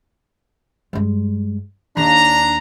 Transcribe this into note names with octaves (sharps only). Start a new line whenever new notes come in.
G2 G#3
D#2 D4 A#5